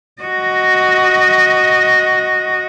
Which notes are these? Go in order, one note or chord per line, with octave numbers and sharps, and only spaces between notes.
F#4 D#5